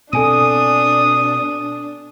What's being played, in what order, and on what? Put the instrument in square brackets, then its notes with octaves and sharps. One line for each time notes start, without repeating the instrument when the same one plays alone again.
[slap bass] B2 C4 [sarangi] D4 [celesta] A4 G#5 D#7 [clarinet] D#6